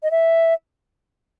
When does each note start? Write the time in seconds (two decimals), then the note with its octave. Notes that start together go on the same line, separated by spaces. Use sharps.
0.03 D#5
0.11 E5